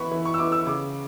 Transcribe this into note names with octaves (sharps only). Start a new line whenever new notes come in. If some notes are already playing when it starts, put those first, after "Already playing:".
Already playing: E3 B3 E4 B5 C#6
E3
C#6
E6
B3 E4 D6
E6
C#3 D6